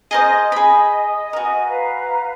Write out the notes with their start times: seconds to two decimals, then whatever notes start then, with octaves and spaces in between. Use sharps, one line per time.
0.11 G#4 A#4 C5 D#5
0.52 G#4 B5
1.33 F#4 A#4 B4 G#5
1.66 B4 F5 A#5